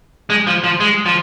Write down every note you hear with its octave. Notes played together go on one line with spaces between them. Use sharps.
G#3
F3
F3
G#3
F3